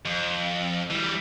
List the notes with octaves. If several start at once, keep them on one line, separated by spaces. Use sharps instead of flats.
F2
E3 G3